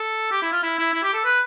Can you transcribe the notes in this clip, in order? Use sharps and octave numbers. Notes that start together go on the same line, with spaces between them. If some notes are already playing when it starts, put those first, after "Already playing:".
Already playing: A4
G4
E4
F4
E4
E4
E4
G4
A4
B4